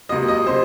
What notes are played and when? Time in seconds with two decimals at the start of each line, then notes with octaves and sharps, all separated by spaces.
0.09 C#2 C3 F#3 A#3 D#5
0.28 D#5
0.47 C3 F#3 C5